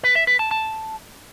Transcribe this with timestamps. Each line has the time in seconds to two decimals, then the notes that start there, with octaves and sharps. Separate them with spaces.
0.03 B4
0.15 E5
0.27 B4
0.39 A5
0.51 A5